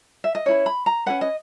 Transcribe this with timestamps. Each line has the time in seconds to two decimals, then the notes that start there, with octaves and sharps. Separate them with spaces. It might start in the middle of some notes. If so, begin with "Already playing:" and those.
0.24 E5
0.35 D#5
0.46 C#4 E4 B4 C#5
0.66 B5
0.86 A#5
1.06 C#4 G#4 B4 F#5
1.21 D#5